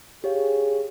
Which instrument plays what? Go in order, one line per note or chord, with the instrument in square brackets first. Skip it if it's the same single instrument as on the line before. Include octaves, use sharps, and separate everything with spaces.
[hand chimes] G4 C#5 F5 [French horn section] G#4